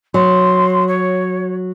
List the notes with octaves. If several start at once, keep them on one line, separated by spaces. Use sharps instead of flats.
F#3 C6
C#5